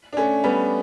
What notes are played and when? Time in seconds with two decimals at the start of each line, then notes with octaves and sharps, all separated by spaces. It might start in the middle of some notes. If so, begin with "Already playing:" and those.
0.13 D4
0.17 A3 C#4
0.44 G3 B3